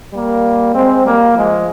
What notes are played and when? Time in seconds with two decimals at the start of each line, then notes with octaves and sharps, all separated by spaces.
0.13 G3 A#3
0.74 G#3 C4
1.05 G3 A#3
1.35 F3 G#3